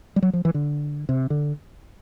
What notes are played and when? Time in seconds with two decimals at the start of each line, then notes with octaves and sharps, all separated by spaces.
0.16 G3
0.22 F#3
0.33 F3
0.45 E3
0.54 D3
1.09 C3
1.30 D3